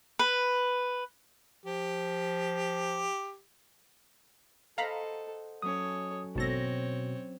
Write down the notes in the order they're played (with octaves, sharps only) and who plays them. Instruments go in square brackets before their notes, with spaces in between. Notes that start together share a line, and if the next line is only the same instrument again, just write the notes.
[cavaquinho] B4
[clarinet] F3 [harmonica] G4
[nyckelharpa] A4 [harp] C5 D#5 F#5 [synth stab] F5 A#5 B5
[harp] F#3 C#4 [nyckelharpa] A4 C#5 [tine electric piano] D#6
[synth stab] G#1 A4 A#6 [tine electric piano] B2 [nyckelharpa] C4 C#5